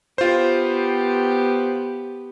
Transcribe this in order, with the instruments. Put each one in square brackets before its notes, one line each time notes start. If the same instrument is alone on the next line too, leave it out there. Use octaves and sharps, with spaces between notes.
[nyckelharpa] B3 G4 [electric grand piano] F4 C5